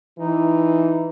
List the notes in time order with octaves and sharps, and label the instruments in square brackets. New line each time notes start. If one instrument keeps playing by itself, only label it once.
[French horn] E3 [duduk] D#4